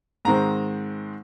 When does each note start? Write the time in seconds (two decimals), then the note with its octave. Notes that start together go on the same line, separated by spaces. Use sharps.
0.25 G#2 D#3 G#3 C4 A#5